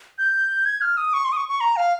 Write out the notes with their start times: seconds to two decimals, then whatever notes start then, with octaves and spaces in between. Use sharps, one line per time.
0.18 G6
0.66 G#6
0.81 F6
0.97 D#6
1.14 C#6
1.25 C6
1.32 D#6
1.37 C#6
1.49 C#6
1.61 A#5
1.76 F5